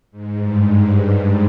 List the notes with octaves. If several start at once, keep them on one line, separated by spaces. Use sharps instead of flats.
G#2
G2